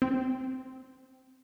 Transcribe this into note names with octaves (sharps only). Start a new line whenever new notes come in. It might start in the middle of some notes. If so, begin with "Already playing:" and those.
C4